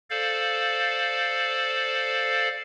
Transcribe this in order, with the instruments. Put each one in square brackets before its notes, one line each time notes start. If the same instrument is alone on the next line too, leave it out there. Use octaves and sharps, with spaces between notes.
[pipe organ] A4 C5 D5 F5